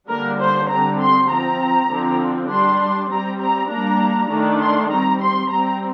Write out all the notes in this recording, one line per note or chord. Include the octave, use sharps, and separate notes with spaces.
D3 G3 A#3 D4 A#4
C5
D3 G3 C4 A#5
C6
F3 C4 A#5
D3 F3 C4
G3 D4 C6
G3 C4 A#5
A#5
G3 A#3 D4 A#5
D#3 A3 D4
C6
G3 C4 A#5
C6
G3 C4 A#5